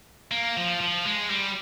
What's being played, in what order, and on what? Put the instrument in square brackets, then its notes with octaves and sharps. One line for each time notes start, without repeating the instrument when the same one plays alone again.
[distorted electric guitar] A#3
F3
F3
G#3
G3